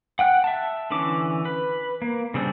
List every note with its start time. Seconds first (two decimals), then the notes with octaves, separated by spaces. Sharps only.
0.19 F#5 G5 F#6
0.44 E5 A5
0.91 D3 E3 C#4 D6
1.45 B4
2.02 A#3
2.34 C#3 G3 C4 D4